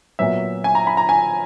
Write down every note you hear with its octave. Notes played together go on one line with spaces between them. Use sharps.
A#2 F#3 B3 E5
G#5
A#5
B5
A#5
G#5